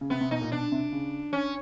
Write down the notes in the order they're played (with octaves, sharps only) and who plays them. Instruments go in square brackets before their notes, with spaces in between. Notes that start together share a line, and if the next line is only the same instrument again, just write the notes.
[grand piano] C#3
[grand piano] C3 [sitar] B3
[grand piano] C3
[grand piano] B2 [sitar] D#4
[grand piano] A#2
[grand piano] B2 [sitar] D4
[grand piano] C3
C#3
[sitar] C#4